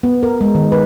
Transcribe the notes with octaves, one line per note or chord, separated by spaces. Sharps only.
B3
A#4
G#3
D#3
B4